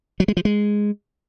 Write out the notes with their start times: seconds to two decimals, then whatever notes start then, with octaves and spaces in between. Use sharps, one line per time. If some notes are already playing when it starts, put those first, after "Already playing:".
0.20 F#3
0.28 G#3
0.37 F3
0.45 G#3